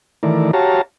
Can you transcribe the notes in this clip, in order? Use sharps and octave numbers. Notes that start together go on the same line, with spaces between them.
D#3 E3 A3 E4 A#4 D5
F#4 G4 C#5 F5 A5 A#5